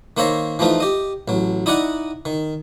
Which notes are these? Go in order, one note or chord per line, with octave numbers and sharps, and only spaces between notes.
D#3 A#3 C5 C#5 E5 A#5
E3 F3 A3 D#4 F4
G4 D#5
A1 F#3
D#4 E4 D5 D#5 F#5 A#5
D#3